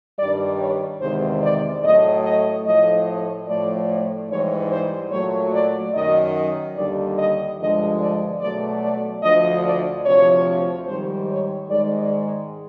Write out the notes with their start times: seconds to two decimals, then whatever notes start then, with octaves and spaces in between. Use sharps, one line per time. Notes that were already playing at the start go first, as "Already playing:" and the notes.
0.18 G2 D#3 G3 D5
0.59 C#5
1.00 E2 C3 D#3 G#3 C5
1.41 D5
1.83 A2 F#3 A3 D#5
2.24 D#5
2.65 A2 F3 A3 D#5
3.47 A2 F3 A3 D5
4.29 G#2 E3 G3 C#5
4.70 C5
5.12 A#2 F#3 A3 C#5
5.54 D5
5.94 F#2 D#3 F#3 D#5
6.76 D#2 D3 G3 D5
7.18 D#5
7.58 G2 D3 F3 G#3 D#5
8.00 D5
8.41 B2 F#3 A3 D5
8.82 D5
9.23 D2 D3 F3 D#5
9.64 D5
10.05 D2 C3 F3 C#5
10.88 G#2 D#3 G3 C5
11.29 C#5
11.69 G#2 D#3 G#3 D5